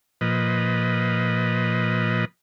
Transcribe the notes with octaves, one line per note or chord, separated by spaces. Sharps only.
A#2 F3 B4 D#5